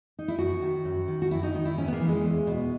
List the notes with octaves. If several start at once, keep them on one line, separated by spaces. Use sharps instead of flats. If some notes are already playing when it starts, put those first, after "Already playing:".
D#4
E4
F#2 F#4
D#3
F#2
D#3
F#4
F#2 E4
D#4
D#3 D#4
E4
G#2 C#4
B3
A#3
E3
G#3
E2
B2